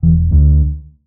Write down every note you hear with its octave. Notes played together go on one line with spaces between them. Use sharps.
E1 E3
D2 D3